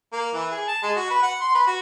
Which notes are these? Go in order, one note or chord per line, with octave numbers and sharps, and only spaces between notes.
A#3
E3
G#4
A5
G#3
F#4
B4
F#5
C6
B4
F#4